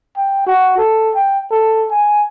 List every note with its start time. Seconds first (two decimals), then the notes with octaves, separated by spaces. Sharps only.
0.17 G5
0.47 F#4
0.78 A4
1.15 G5
1.51 A4
1.91 G#5